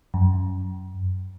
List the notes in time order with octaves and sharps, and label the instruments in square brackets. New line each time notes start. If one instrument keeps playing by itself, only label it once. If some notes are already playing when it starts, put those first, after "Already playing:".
[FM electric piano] F#2